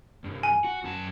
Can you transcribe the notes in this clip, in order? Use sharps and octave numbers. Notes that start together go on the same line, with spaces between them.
C2 G2
G#5
F#4
F#2 A5